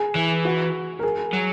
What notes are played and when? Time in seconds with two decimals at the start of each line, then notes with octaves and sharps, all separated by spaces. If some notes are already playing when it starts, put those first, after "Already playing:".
Already playing: G#4
0.15 E3
0.45 F#4
0.99 A#4
1.03 G#4
1.33 F#3